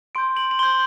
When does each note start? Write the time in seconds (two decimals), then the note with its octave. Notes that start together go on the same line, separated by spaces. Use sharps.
0.15 C6 G6 D7
0.37 F#7
0.51 F#7
0.59 C6 G6 G7